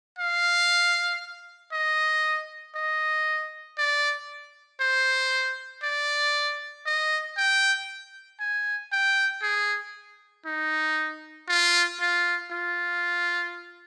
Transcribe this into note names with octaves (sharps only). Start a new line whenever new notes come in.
F5
D#5
D#5
D5
C5
D5
D#5
G5
G#5
G5
G#4
D#4
F4
F4
F4